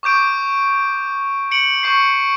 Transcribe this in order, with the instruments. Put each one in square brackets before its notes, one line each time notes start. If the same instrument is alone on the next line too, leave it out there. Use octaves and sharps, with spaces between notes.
[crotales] C#6 D6 G6 D7
C#7 D7 F#7
C#6 G6 C7